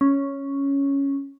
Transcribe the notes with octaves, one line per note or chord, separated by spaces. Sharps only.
C#4